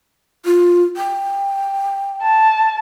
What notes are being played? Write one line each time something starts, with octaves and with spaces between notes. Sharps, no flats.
F4
G5
A5